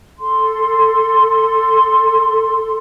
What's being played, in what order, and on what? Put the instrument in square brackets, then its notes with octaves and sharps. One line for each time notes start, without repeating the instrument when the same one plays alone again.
[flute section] A4 C6